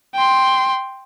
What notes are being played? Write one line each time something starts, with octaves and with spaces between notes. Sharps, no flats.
G5 C6